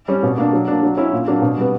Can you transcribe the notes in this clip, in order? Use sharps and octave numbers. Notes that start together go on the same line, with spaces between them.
G3 C#4
B2
A#3 D4
F#3
A#3 D4
F#3
C#4 E4
A#2
F#3 A#3 D4
B2
G3 B3